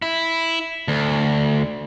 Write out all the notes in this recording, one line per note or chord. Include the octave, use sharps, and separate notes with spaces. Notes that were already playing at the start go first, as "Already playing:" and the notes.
E4
D2